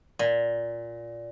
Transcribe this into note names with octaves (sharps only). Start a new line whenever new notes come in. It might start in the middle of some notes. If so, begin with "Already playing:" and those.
A#2